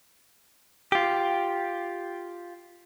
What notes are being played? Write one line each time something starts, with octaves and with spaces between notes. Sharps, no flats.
F4 G4